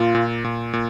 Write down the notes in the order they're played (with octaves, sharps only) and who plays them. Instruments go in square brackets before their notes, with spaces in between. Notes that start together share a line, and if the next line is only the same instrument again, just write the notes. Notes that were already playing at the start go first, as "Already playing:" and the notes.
Already playing: [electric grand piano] A#2 [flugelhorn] F4
[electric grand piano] A#2
A#2
A#2